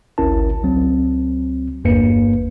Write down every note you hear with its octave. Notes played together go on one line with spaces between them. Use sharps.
G#1 D2 C#4 E4 A#4 A5
C#2 F#3 C4
G1 E2 G2 A#3 B4 C#7